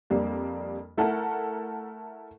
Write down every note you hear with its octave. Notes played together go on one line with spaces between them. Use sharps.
F2 G3 A#3 D4
A3 E4 A4 A#4 F#5